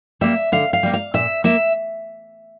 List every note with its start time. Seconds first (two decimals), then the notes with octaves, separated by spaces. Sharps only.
0.21 G3 A#3 E5
0.52 D3 F5
0.73 F5
0.83 G3 A#3
0.94 F5
1.14 A#2 E5
1.44 A#3 E5